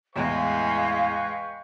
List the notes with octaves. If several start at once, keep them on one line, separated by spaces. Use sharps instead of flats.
E2 A2 G#3 B4 F5 G5 C#6